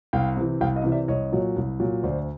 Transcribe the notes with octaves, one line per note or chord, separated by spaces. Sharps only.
C2 F5 G5
C3 E3
C2 F5 G5
D#5 F5
C3 E3
D5 E5
C2 C#5 D#5
A#2 F#3
C2
A#2 F#3
D2 C5 D5